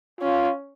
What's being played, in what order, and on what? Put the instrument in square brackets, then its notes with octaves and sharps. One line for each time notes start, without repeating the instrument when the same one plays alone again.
[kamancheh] C#4 [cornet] F4